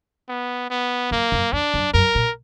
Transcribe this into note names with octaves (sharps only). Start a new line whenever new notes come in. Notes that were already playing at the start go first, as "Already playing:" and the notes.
B3
B3
F#2 A#3
F#2
F2 D4
F#2
F#2 A#4
A#2